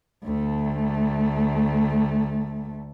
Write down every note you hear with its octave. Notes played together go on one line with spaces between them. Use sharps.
D2 A3